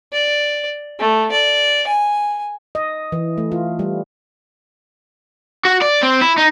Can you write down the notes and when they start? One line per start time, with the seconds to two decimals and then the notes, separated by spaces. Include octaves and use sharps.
0.13 D5
0.99 A3
1.32 D5
1.87 G#5
2.75 D#5
3.12 E3
3.38 A3
3.52 F4
3.79 G3
5.65 F#4
5.82 D5
6.03 C4
6.22 E4
6.37 D#4